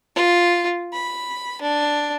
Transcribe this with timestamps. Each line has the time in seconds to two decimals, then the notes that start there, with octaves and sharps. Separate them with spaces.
0.16 F4
0.93 B5
1.61 D4